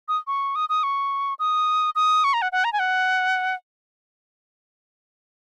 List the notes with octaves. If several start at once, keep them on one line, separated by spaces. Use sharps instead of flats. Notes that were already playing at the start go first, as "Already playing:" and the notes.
D#6
C#6
D#6
D#6
C#6
D#6
D#6
C#6
A#5
F#5
F#5
A#5
G#5
F#5